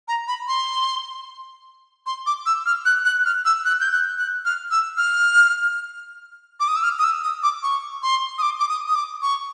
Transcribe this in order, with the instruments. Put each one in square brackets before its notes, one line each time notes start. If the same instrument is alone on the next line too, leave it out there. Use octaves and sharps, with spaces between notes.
[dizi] A#5
B5
C6
C6
D6
E6
F6
F#6
F#6
F6
E6
F#6
G6
F#6
F#6
F6
E6
F6
D6
D#6
E6
F6
D#6
E6
D#6
D6
C#6
C6
D#6
D6
D6
D#6
D#6
D6
C#6